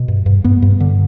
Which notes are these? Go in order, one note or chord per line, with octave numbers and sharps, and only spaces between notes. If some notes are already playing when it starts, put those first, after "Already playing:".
Already playing: B2
G2
G2
G2 B3
G2
D3